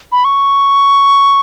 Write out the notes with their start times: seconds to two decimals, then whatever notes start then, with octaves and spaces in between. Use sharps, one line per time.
0.12 B5
0.25 C#6